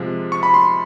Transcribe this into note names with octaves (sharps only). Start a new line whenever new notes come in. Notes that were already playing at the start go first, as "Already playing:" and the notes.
Already playing: C3 F3 G#3
C#6
B5
C6